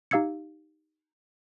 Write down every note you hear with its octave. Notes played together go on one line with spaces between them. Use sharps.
D#4 G4 F5 E6 G#6 C#7